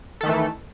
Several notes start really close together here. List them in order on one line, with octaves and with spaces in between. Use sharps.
A4 D#3 A3 E3